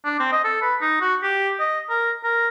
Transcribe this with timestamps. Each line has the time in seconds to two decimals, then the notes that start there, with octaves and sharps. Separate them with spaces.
0.05 D4
0.19 C4
0.32 D#5
0.44 A4
0.62 B4
0.81 D#4
1.01 F#4
1.23 G4
1.60 D#5
1.89 A#4
2.24 A#4